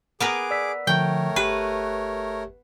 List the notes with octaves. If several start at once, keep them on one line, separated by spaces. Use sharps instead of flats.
B3 G#4 A#4 B4 D6
D5 E6 B6
D3 F3 A3 A#4 C#5 G5
G1 G4 B4